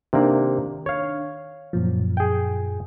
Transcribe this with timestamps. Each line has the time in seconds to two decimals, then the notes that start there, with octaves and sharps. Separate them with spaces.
0.13 C3 D#3 A#3 D4
0.86 C#5 F5
1.73 F#2 A#2 F3
2.17 G#4 G5